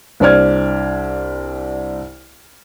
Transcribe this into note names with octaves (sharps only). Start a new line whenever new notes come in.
C2 D4 C5 D5 F6 G#6